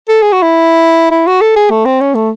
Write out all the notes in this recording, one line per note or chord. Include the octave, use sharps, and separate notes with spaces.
A4
G#4
F#4
E4
E4
F#4
A4
G#4
A3
C4
C#4
A3